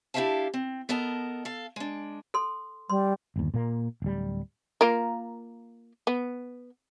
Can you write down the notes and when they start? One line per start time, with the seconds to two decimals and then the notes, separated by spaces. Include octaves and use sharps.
0.14 D4 E4 G4 E5 F5 A5
0.54 C4
0.89 B3 A4 A#4 D#5 A5
1.45 A4 F5
1.76 G#3 D4
2.34 A4 C6
2.90 G3 C6
3.36 G1 D#2
3.54 A#2 A#3
4.02 D1 G3
4.81 A#3 F4 A#4
6.07 B3